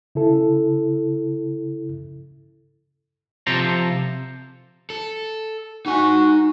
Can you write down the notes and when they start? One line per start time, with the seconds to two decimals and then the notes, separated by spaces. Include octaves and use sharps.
0.15 C#3 E4 A4
3.47 C3 F3 A4 C5 A#5
4.90 A4
5.86 D#4 F#4 G#5